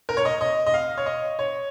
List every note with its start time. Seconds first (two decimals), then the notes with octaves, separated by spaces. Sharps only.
0.09 A#4
0.17 C#5
0.25 D#5
0.41 D#5
0.67 D#5
0.74 F5
0.97 C#5
1.06 D#5
1.39 C#5